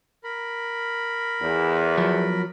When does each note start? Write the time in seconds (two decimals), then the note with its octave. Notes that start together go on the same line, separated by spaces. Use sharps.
0.24 A#4 B5
1.41 E2
1.98 F3 F#3